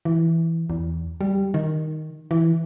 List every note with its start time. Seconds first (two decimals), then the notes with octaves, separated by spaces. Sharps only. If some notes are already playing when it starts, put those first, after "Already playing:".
0.05 E3
0.70 E2
1.21 G3
1.54 D#3
2.31 E3